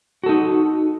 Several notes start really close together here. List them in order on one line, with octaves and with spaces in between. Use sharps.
F#4 A4 D#4